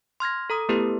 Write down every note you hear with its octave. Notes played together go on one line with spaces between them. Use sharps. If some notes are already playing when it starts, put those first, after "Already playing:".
C6 F6 G#6 A#6
A4 A#5 D#6
A3 B3 E4 G4 A4 B4